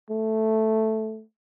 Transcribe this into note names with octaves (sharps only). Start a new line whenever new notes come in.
A3